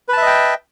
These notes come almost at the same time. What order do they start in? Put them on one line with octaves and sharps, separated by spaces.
B4 A5 E5 D#5 G5